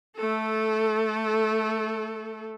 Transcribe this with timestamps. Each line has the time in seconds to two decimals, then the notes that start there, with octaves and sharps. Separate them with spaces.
0.16 A3 A4